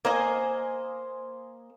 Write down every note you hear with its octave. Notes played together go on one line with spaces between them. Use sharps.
A#3 C5 D#5 G#5